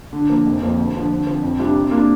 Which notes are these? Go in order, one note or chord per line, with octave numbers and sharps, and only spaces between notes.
D3
F3 A#3
F1
F2 F3 A#3
D2
D3 F3
D3
F3 C4
F2
C3 G3 D4 F4
C3
A#3 D4 F4 A#4